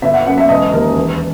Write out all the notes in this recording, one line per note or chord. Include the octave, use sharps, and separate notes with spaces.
G1 E5
F#5
F#2 F#5
E5
E1 D#5
D#2 A#4
E2